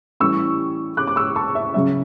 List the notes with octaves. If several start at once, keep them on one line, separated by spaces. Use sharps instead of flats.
A2 E3 G3 C#4 C#6 E6
D6 F#6
D6
C#6 E6
A5 C#6
E5
C#3 F#3 C#4 E5